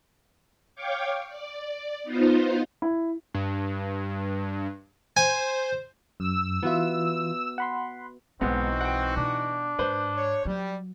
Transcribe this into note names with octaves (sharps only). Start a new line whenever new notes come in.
C#5 F5 G5 C#6 D6
D5
B3 D#4 F4 C5
E4
G2
C5 G#5
F#2 E6
E3 B3 F4 F#4 E5
F#5 B5 C6
B1 G#2 E3 G#3 B3 C4 D#4 F#4
F#5 G5
B2 D4
G#2 B4 C5
C#5
F#3 G3